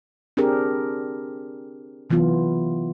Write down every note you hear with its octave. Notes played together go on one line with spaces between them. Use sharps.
C4 D4 G4 G#4 A#4
C3 E3 F#3 B3 F4